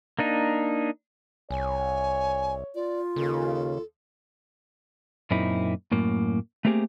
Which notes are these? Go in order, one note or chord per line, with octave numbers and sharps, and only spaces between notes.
A#3 D4 D#4
C2 C#5 G#5
F4 D5
D#2 C#3 A4
F#2 A#2 A#3 C4 D#4 E4
F#2 A2 A#3
A3 A#3 C4 G4 G#4